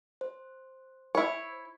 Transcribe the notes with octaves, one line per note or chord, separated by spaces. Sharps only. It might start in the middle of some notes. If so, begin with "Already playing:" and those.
C5
E4 C#5